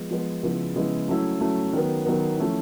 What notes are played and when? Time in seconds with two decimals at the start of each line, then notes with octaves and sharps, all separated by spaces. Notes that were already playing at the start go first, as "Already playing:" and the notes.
Already playing: F3 G#3 B3
0.11 F3 G#3 B3
0.43 C#3 F3 G#3 B3 E4
0.76 C#3 F3 G#3 B3 E4
1.08 F#3 A3 C#4 E4
1.40 F#3 A3 C#4 E4
1.73 D#3 F#3 B3
2.06 D#3 F#3 B3
2.38 F3 A3 C#4 E4